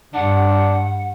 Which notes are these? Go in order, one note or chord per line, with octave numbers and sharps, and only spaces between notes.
G2 D4 F#5